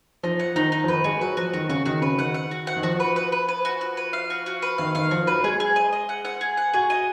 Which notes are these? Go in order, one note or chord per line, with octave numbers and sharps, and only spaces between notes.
F3 D#4
F#5
D#3 D#4
D#4
F3
D#3 B4
G#3 F#4
F#3 B4
F3 F#4
D#3 F#4
C#3 F#4
D#3 F#4
C#3 B4
D#3 F#5
F#5
F#4
F#5
D#3
F3 F#4
B4
B4
B4
B4
F#4
F#4
B4
F5
F#4
F#4
B4
D#3 F5
D#3 F5
F3 F#4
F#3 B4
G#3 G#4
G#4
D#5
D#5
F#5
F#5
G#4
F#5
F#4 G#4
D#5